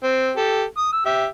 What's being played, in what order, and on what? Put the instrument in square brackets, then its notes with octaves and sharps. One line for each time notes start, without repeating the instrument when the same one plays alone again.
[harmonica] C4
G4 A4
D#6
E6
G4 E5